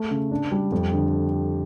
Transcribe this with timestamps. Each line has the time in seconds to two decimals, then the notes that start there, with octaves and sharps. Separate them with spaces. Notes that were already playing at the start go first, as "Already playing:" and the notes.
Already playing: A3
0.11 C#3
0.31 D4
0.52 G3
0.72 F2
0.92 D3